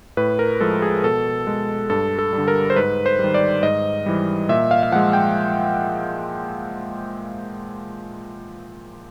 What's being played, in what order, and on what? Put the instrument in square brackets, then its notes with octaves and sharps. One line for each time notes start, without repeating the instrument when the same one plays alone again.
[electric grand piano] A2 B4
A#4
F3 G#3 A4
G#4
B2 A4
G#3
G2 A4
A4
G3
D3
A#4
C5
G#2 B4
C5
D#3 G3
D5
G#2 D#5
E3 G3
A#2 E5
F5
F5
F3 G#3 F#5
G5